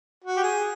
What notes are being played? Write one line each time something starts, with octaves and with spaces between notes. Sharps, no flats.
F#4
G4
G#4